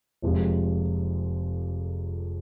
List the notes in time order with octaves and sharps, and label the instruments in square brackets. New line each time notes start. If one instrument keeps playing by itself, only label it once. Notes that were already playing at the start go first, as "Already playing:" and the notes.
[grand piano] F1 F2 C3 F3 G#3